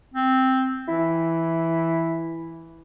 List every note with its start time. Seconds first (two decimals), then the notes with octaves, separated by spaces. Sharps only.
0.14 C4
0.88 E3 E4